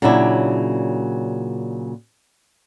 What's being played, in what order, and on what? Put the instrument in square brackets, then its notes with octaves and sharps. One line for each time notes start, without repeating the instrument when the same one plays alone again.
[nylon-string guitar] A#2 C#3 F#3 D4 E4